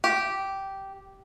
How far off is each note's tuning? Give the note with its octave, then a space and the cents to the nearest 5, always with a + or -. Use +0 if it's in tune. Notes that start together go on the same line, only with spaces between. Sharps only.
G4 -10